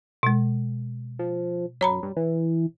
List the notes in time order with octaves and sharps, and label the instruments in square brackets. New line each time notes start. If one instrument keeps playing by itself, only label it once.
[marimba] B2 G#3
[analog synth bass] F3
[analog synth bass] F#2 [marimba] C#5 A#5 B5
[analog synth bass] G2
E3